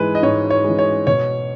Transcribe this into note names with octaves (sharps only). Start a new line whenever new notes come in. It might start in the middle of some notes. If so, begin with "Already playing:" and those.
Already playing: G#2 E3 G#3 B4
D#5
G#2 C#5
C#5
E3 G#3
C#5
B2 C#5